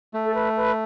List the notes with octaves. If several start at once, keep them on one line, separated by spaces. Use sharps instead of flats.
A3
A4
B4
B4